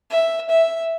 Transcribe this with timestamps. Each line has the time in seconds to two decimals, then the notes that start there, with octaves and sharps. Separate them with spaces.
0.10 E5
0.49 E5